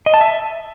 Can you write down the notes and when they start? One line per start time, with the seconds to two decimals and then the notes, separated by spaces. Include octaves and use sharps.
0.06 D#5
0.14 A5
0.21 E5